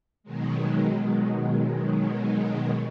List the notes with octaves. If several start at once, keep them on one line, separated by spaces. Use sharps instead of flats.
B2 D#3 F#3 G#3